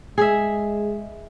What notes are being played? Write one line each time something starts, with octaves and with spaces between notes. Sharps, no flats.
G#3 G#4 E5